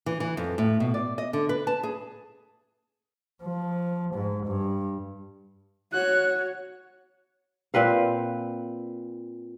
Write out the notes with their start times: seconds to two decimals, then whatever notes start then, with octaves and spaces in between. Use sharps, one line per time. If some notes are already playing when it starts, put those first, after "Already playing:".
0.06 E3
0.20 E3
0.37 F2
0.58 A2
0.80 B2
0.94 D5
1.18 D#5
1.33 D3
1.49 B4
1.67 A5
1.83 G#4
3.42 F3
4.14 G#2
4.46 G2
5.93 F#4 C#5 F#6
7.74 A#2 C4 B4 F5